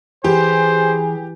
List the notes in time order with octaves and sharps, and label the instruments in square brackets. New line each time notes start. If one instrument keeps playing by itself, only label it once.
[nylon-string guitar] E3 [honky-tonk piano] G4 [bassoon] G#4 [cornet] C5